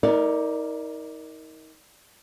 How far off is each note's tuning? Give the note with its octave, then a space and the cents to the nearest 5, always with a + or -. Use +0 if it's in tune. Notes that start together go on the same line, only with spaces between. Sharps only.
D#4 +35 A#4 +0 D5 +0